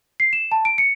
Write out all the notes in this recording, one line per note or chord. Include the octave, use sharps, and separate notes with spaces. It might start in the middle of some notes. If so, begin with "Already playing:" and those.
C7
E7
A5
D7
C#7